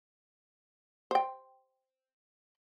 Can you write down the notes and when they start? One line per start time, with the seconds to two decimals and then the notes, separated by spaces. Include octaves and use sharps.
1.11 C5 G5